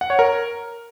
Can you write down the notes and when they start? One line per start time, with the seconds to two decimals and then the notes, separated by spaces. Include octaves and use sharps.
0.01 F#5
0.10 C#5
0.19 A#4